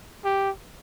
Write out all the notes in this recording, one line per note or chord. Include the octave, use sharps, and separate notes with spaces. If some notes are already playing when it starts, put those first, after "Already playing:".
G4